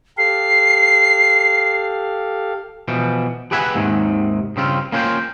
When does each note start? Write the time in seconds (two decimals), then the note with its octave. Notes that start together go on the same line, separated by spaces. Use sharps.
0.18 G4 A4 F5 C7
2.88 B2 E3 F3
3.51 G4 G#4 B4 E5 F#5 G#5
3.75 D#2 G#2 C3 D#3
4.56 G2 C#3 C4 F4
4.92 A#3 C#4 F4 B4 C5 G5